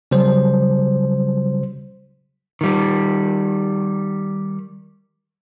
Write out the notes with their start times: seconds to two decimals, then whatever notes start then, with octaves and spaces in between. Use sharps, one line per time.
0.11 C#3 F#3 G3 C5
2.61 D#3 G3